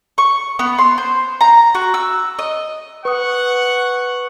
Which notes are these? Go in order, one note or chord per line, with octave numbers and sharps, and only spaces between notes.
C#6
B3
C6
C5
A#5
F#4
E6
D#5
B4 F#5 C#6 D#6